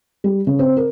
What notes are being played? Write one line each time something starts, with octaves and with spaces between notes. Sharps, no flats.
G3
C#3
C4
A#4